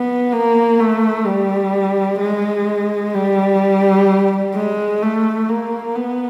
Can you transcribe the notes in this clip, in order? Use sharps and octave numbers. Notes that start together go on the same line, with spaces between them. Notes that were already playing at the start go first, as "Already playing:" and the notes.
Already playing: B3
A#3
A3
G3
G#3
G3
G#3
A3
A#3
B3